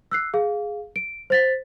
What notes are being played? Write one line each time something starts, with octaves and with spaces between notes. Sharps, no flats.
E6 F#6 C7
G#4 F5
D7
C5 A6 B6